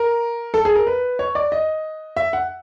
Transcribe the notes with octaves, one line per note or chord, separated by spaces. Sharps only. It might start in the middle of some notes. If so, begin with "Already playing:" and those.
Already playing: A#4
A4
G#4
A#4
B4
C#5
D5
D#5
E5
F#5